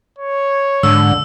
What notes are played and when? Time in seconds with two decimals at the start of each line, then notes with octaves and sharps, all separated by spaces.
0.19 C#5
0.83 G#2 D3 E6